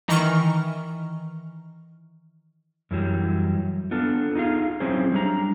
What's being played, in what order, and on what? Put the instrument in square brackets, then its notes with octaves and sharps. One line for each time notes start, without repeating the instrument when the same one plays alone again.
[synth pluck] D#3 E3 D#5 A#5 C#6 F6
[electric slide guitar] F#2 E3 F#3 G3
B3 D4 F4 A4
D#4 F4 G#4 F5
F#3 C4 C#4 E4 G#4 C5
G3 D4 A#5